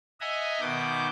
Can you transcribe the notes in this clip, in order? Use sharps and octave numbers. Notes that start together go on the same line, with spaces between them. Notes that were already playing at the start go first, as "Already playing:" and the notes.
D#5 E5 F#5 G#5 A#5 D#6
B2 D#3 F#5 D6 G6